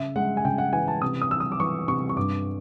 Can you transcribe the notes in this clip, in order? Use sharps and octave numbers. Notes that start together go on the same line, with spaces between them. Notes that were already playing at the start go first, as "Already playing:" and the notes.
Already playing: C#3 E5
G#3 F#5
G#5
C#3 G5
F#5
E3 G#5
A5
C3 D#6
D#6
E3 E6
D#6
D6
E3 C#6
C3 C#6
C#6
G2 D6